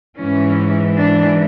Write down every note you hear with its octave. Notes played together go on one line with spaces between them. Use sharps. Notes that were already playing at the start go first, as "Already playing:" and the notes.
G#2 E3 C#4
D4